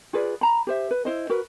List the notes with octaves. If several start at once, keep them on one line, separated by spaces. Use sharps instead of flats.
F4 G#4 B4 D5
A#5 B5
G4 C5 E5
B4
E4 C5 D#5
F#4 A#4 B4